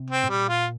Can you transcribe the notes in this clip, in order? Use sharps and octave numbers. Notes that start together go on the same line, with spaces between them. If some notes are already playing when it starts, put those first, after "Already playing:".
Already playing: C3
C4
A2
A#2 G3
F4